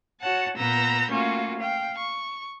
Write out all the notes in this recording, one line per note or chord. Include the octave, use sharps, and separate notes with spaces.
F#4 C#5 F#5 A5
A#2 B3 B4 A#5 E6 G6
A3 A#3 C#4 F4 F#4
F5 G5
C#6